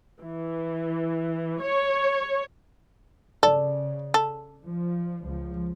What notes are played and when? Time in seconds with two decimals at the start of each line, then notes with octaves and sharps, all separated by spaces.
0.22 E3
1.61 C#5
3.43 C#3 A4 D5
4.14 A4
4.64 F3
5.23 C#2 F3